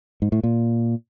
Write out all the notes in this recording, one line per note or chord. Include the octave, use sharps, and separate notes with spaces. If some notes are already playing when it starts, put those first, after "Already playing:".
G#2
A2
A#2